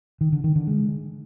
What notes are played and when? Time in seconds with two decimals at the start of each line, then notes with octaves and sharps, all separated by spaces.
0.21 D#3
0.32 D3
0.44 D#3
0.55 D3
0.67 G#3